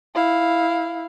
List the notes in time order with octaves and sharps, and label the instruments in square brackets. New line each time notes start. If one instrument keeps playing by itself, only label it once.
[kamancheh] E4 F5